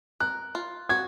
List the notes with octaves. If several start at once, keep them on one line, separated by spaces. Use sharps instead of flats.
A#4 F#6
F4
F#4 G#6